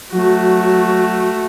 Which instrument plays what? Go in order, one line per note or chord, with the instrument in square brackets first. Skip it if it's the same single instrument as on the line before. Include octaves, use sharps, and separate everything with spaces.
[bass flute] F#3 [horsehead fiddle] A3 F#4